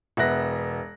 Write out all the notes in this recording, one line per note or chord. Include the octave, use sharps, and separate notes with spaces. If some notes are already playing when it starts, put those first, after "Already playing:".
E1 B3 E5 F#6 A#6